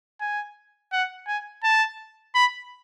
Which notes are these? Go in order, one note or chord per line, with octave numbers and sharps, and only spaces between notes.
G#5
F#5
G#5
A5
B5